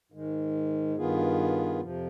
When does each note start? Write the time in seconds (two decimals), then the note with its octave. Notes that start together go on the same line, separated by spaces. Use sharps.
0.12 G#2 D#3 G#3
0.96 G2 D#3 B3 F4 G#4
1.80 F2 C3 F3